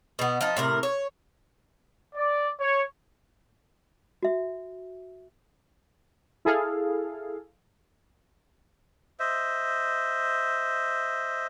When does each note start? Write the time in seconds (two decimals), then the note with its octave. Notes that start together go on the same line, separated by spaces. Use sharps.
0.19 B2 B3
0.41 F3 D#4
0.57 A2 C3 A#4
0.83 C#5
2.15 D5
2.59 C#5
4.23 F#4 E5
6.45 E4 G#4 A4 F5
9.20 C5 D#5 E5